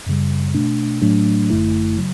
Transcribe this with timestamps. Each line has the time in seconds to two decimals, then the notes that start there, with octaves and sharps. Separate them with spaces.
0.06 F#2 C#3 G3
0.54 B2 A3 D4
1.02 A2 F#3 A3 D4
1.50 G1 F#2 D3 A3 E4
1.98 C#3 F#3